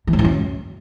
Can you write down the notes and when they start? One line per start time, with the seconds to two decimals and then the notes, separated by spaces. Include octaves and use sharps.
0.07 E3
0.13 G#2
0.19 E3
0.24 F#2